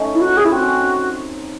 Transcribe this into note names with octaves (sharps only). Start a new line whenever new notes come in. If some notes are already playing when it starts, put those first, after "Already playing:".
Already playing: A3 C#4 D#4
E4
F#4
G#4
E4
C4 F#4
C#4